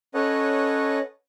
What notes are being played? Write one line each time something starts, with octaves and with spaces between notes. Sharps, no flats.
C#4 A4 B4 C#5 D#5 F#5